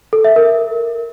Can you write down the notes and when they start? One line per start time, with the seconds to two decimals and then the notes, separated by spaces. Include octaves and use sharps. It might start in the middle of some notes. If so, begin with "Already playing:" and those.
0.13 A4
0.24 E5
0.36 A#4